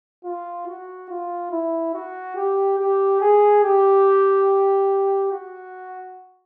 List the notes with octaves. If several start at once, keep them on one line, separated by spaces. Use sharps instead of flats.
F4
F#4
F4
E4
F#4
G4
G4
G#4
G4
F#4